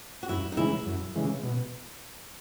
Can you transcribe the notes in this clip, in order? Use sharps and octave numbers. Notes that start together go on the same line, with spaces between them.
F#4
F#2 E4
D#4
C#3 E3 G#3 E4
F#2
C#3 E3 G#3
B2